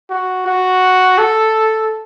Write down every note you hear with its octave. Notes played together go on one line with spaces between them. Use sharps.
F#4
F#4
A4